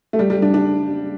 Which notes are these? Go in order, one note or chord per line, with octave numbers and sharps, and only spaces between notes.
A3
G3
G3
D4
D4